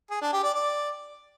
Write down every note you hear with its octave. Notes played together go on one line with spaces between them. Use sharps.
G#4
D4
G4
D5
D5